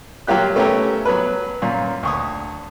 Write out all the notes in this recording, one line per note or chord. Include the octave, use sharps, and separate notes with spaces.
F#3 A#3 F4 G4 F#6
A3 B3 C#4 G4 A#4 C#5
F#3 B3 B4
F#2 A#2
D2 C#6 D#6